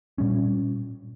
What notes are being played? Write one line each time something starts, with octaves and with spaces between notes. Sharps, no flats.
A#2 G3 C#4